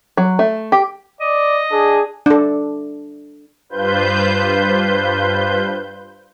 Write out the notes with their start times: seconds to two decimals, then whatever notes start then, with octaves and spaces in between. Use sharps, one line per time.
0.17 F#3
0.39 A3
0.72 G4
1.21 D5 D#5
1.72 D4 G#4
2.26 D4 A4
3.69 G2 F4 B4 C5 G6